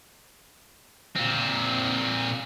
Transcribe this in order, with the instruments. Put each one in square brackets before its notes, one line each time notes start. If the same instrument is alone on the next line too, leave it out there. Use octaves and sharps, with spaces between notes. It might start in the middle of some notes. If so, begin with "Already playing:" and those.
[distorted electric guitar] A#2 C4